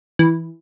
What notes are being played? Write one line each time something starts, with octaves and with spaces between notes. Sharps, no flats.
E3